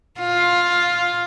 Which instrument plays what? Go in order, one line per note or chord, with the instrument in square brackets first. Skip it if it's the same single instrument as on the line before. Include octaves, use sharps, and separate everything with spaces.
[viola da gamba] F4